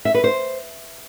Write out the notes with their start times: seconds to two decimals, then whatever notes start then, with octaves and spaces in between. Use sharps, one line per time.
0.05 E5
0.14 B4
0.24 C5